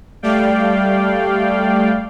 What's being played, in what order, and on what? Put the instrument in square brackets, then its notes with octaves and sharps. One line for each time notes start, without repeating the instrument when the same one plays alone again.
[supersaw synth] G3 A3 D5 F5 G5